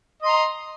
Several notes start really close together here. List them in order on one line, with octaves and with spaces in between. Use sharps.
D#5 C6 A#5